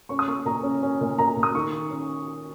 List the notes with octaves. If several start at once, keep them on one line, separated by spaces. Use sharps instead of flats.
C#4 C#6
D#6
A#3 C#6
A#2 A#5
C#4
C#4
A#2
A#2 A#5
A#2
D#6
D#3 C#6
D#3
C#4